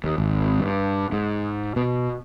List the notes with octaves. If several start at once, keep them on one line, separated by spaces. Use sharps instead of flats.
D#2
G#1
G2
G#2
B2